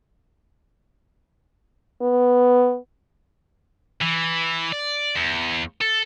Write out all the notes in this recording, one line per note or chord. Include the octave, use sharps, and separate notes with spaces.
B3
E3
D5
E2
A4